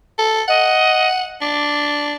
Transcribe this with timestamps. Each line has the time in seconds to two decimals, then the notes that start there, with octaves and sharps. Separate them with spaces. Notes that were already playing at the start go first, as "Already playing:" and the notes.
0.18 A4
0.48 D#5 F#5
1.41 D4 D6